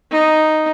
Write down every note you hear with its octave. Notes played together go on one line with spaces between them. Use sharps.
D#4